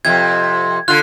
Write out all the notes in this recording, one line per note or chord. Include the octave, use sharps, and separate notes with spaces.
F2 C3 G#6
D3 F4 F#6